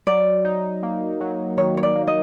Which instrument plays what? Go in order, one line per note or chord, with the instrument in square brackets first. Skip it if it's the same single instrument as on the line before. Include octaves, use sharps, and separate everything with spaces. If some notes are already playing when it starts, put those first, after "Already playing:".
[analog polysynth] F#3 [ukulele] D5
[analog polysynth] D#4
A#3
F#3
[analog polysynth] D#3 [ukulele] C#5
[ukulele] C#5
D5
[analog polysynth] A#3
[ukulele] D#5